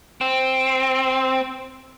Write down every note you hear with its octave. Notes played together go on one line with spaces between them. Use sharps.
C4